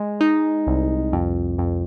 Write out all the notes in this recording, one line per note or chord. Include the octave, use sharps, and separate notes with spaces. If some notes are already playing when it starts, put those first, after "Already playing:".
Already playing: G#3
D#4
C2
F2
F2